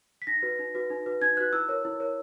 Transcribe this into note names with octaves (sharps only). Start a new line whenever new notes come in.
B6
D#4 A#6
F#4 B4
D#4
F#4 B4
D#4
F#4 B4
D#4 G#6
F#4 B4 F#6
E4 E6
A#4 C#5
E4
A#4 C#5